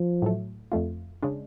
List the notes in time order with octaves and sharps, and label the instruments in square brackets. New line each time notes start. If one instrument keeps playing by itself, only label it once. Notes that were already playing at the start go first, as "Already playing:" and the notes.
Already playing: [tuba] F3
[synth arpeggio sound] A2 F#3 A3
F2 F3 A3 F4
C#3 G#3 D4